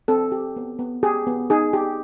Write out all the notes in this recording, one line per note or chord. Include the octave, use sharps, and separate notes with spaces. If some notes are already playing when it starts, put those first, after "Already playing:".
C4 A4
G4
B3
B3
G4 G#4
B3
D#4 G#4
G4